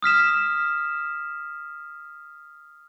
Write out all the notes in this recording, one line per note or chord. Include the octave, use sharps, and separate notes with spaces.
D#6 F6 B6 E7